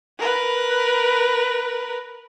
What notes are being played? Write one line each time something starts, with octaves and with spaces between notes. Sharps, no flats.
A#4 B4